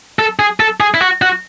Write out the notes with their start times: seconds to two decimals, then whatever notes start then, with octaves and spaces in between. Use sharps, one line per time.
0.19 A4
0.39 G#4
0.60 A4
0.80 G#4
0.94 E4
1.01 F#4
1.22 F#4